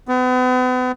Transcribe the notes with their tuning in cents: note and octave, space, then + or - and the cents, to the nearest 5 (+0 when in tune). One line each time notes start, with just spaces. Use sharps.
B3 +40